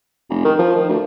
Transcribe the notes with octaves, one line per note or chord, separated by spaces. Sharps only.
F1
D#3
F3
D#3
D2